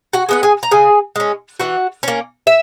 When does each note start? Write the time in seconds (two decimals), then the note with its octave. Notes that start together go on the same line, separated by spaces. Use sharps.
0.13 F#4 F#5
0.29 G#3 B3 F#5
0.43 G#4 G#5
0.63 A#5
0.71 C#3 G#4 G#5
1.16 G#3 C#4
1.59 E3 F#4 F#5
2.03 A#3 C#4
2.47 E5